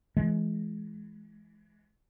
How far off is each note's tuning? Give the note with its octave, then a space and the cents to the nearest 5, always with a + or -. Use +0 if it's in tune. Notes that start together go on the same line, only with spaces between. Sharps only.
E3 +15 G#3 +25